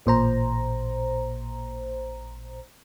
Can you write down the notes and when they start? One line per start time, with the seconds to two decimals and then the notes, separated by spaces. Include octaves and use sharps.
0.06 A1 A#2 C5 A#5